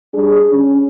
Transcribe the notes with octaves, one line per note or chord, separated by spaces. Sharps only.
G3 D4 G#4
C#4